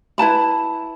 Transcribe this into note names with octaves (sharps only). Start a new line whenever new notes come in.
E4 B4 A5 B5